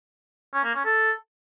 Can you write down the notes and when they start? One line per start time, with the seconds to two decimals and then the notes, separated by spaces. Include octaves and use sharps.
0.54 C#4
0.64 A#3
0.75 C#4
0.85 A4